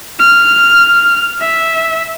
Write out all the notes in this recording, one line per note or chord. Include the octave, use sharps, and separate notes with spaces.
F6
E5